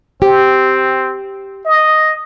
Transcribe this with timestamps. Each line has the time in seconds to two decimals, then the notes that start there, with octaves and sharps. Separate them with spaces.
0.22 C4 G4
1.65 D#5